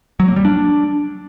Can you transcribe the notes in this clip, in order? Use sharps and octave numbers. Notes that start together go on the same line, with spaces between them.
F#3
A#3
G3
D4